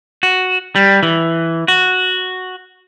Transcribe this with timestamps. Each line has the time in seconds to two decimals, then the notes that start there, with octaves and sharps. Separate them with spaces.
0.23 F#4
0.76 G3
1.03 E3
1.68 F#4